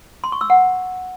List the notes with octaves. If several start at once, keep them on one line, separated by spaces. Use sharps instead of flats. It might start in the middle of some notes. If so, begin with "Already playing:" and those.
C6
C#6
E6
F#5